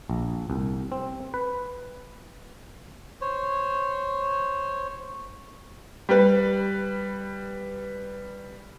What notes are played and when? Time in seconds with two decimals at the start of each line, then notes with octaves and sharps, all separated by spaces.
0.10 A#1
0.50 C2
0.92 C4
1.34 B4
3.21 C5 C#5
6.09 G3 B4